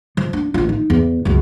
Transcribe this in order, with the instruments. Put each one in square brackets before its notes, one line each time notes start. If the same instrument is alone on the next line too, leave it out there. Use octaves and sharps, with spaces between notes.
[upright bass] F3
D4
A1 F4
D#4
E2
C#2 F#2